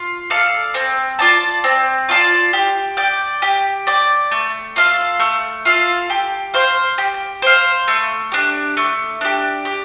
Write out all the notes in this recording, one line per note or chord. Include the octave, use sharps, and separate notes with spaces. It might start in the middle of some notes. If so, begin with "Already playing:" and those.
Already playing: F4
A4 D5 F5
C4
F4 D5 A5
C4
F4 D5 A5
G4
D5 G5
G4
D5 G5
A3
F4 A4 F5
A3
F4 A4 F5
G4
C5 F5
G4
C5 F5
A3
D4 G4
A3
D4 G4
G4